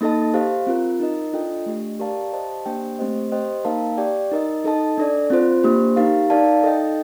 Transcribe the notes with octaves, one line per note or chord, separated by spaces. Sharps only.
A#3 D#4 A4 D#5 A5
G4 C5 F5
C4 F4 A#4
D#4 A#4 D#5
D4 F4 A4 D#5 G5
A3 D4 G4
G4 A#4 D5 F5 A5
G4 C5 D#5 A5
A#3 D4 G4 C5 G5
A3 C4 G4 C5 D#5
G4 C5 D#5 G5
A#3 D#4 A#4 F5 A5
G4 D5 G5
D#4 A#4 D#5
D#4 A4 D#5 A5
D4 A4 D5
C4 F4 C5
A#3 D4 G4 C5
D#4 G4 A#4 F5
D#4 A#4 D5 F5 A5
D#4 A4 D#5 G5